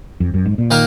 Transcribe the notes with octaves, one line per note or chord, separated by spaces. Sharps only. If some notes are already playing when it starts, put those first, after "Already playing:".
F2
F#2
G#2
A#2
D#3 A#3 A#4